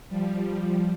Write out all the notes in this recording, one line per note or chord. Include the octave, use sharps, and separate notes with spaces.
F3 G3